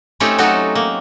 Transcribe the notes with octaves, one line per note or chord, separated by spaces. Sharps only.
A3 C4 C#4 D#4 G4 A4
F#3 A3 D#4 F#4 G4 A4
A#3